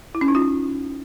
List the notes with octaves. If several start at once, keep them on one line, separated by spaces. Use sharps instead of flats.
E4
C#4
D#4
F4